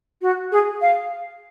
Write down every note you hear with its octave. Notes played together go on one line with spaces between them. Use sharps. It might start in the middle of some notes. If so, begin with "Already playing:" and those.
F#4
G#4
F5